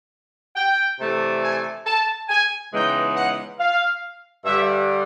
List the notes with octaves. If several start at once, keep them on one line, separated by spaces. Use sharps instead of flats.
G5
C3 E3 A3 D4
G#5
A5
G#5
C#3 E3 G#3 B3 D#4 G5
F#5
F5
G2 D3 G3 E5